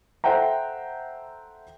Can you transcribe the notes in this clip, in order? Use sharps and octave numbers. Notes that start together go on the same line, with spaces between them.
A4 C5 E5 F#5 G5 A#5